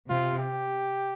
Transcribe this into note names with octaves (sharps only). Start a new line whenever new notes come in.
C3 F4
G4